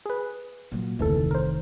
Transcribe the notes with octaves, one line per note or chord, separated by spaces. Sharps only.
G#4 B4
A#2 F#3
F1 D2 D#3 E3 A4
A#4 C5